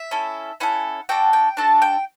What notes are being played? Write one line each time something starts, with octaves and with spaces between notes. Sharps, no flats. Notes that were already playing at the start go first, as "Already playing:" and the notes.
Already playing: E5
C#4 E4 A4
C#4 E4 A4 F#5
D4 F#4 A4 G5
G5
D4 F#4 A4 A5
G5